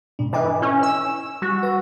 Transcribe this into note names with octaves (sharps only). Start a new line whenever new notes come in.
G#2 B2 D4
E3 A4 D#5 D6
C#4 E4
G#5 E6
G3 F#4
B4 E6 A#6